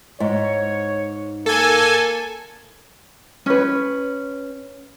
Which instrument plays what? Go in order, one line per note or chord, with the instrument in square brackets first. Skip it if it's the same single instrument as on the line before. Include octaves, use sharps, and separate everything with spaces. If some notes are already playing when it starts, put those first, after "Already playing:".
[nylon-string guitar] G#2 [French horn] C#5
[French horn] A#3 [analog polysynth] A4 G#5
[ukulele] C#4 B4